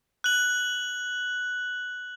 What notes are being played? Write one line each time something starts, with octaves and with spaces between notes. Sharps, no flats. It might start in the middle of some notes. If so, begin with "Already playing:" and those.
F#6 F#7